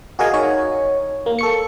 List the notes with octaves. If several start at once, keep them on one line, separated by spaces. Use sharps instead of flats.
F#4 G#4 A#4 D#5 F5 G#5
D#4 C#5
A#3
A4 C#6 C#7